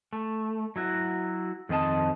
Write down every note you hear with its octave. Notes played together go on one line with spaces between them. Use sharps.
A3
F#3 E4 F#4
F2 D#3 C4 D#5 A5